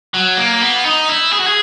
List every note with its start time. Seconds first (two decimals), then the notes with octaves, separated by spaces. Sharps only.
0.14 F#3
0.37 A#3
0.61 B3
0.85 D#4
1.08 E4
1.33 G#4
1.40 F#4
1.47 G#4